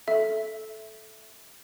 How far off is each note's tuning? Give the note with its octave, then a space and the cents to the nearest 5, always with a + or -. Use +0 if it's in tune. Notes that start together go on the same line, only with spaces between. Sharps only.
A4 -15 E5 +0